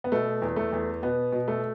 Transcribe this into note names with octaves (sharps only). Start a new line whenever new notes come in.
B3
B2 A3
E2
A3
E2
B2 B3
B2
A3